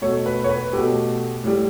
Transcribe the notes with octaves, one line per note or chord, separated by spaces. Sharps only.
B2 A3 C#5
B4
C#5
B4
B2 A3 G4
A2 G3